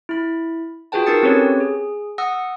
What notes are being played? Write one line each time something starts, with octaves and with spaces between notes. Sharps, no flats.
E4 B5
F4 F#4 G#4 B4 G5 A5
D#4 A#4 A5 D#6 A6 C#7
C4 C#4 G4 A4 B4 C#5
G#4
F#5 D#6 E6 A#6